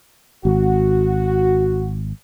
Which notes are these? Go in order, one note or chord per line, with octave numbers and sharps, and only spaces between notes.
G#1 F#4